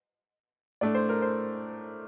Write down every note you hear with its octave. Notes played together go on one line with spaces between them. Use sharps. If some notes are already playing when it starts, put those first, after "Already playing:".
A2 A3 D4 D5
C5
A#4
C5